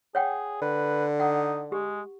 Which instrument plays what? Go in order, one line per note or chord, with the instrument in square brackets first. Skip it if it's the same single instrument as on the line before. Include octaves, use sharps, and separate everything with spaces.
[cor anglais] G#4 [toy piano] C#5 F#5 G5
[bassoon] D3 [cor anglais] B4
[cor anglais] D#4 [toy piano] F#5
[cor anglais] G#3 [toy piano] G4